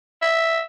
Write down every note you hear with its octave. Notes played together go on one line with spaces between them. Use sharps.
E5